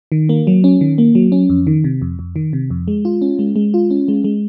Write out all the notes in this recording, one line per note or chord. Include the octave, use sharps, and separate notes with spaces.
D#3
A#3
F#3
C#4
D#3
A#3
F#3
C#4
F2
D#3
C3
F2
F2
D#3
C3
F2
G#3
F4
C#4
G#3
G#3
F4
C#4
G#3
G#3